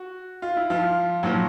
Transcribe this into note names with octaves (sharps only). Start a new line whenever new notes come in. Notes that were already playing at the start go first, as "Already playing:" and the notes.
Already playing: F#4
F4
E4
F3 F4
A#2 F3 F#3 F#4